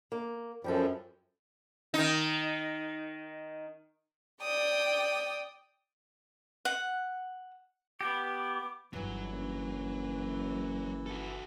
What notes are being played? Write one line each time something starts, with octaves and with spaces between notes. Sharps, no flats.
A#3
F#2 F3 G3 G4 A4
D#3 D#4
D5 G5 D#6
F#5
B3 G4 D6
G1 F#2 E3 F#3
F#1
F#4 A4